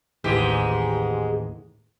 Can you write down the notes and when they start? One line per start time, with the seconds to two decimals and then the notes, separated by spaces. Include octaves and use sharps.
0.24 A1 D#2 G#2 E3 G#3 G4